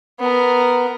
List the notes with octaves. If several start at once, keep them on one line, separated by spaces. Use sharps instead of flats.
B3 A#4